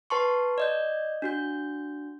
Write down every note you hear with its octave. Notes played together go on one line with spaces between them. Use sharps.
B4 A5 C6 C#6
D5 D#5 G6
D4 F#4 G6